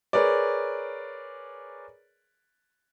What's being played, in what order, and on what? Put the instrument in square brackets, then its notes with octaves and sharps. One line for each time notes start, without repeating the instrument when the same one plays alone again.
[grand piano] G#4 A#4 B4 C#5 D5